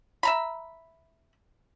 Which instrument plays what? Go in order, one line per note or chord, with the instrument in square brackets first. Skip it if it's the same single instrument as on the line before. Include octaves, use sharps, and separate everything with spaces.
[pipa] E5 A#5 B5